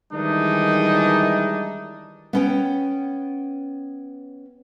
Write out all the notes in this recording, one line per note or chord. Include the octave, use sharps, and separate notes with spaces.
D#3 E3 G3 G#3 D4 D#4
B3 C#4 G5